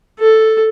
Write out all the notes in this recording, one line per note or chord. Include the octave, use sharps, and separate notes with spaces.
A4